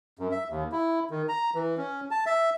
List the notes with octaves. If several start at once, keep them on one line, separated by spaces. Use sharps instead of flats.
F#2
E5
D#2
E4
D#3
A#5
E3
C#4
A5
E5